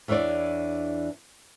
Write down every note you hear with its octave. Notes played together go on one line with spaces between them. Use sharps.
E2 E3 D4 C#5 D5